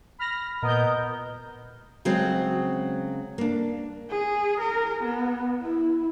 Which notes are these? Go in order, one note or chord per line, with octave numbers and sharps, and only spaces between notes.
B5 F6 A#6
A#2 B3 A#4 D#5 G6
C#3 F#3 G#3 C4
A#3 D4
G#4
A#4
B3
E4